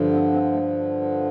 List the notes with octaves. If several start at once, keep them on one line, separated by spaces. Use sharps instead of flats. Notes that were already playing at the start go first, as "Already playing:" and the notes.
Already playing: G2 D3 F3
C4
C4
A3